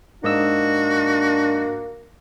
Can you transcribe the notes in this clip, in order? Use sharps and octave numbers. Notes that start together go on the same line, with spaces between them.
G#2 A#3 D4 F#4 D#5 E6